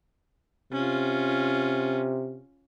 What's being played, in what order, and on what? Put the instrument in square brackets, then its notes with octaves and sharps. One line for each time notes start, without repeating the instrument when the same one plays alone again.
[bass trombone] C3 [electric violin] C#4 F4